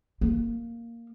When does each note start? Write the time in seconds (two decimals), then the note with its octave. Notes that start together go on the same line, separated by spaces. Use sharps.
0.21 A#3